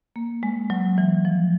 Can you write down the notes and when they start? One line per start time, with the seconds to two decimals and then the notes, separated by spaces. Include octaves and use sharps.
0.16 A#3
0.43 G#3
0.70 F#3
0.98 E3
1.25 F3